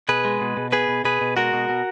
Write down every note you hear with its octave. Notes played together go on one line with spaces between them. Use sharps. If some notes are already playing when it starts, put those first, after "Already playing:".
B2 G#4 B4
G#3
B2
B2
B3 G#4 B4
B2
B2 G#4 B4
B2
G#3 F#4 A#4
B2
B2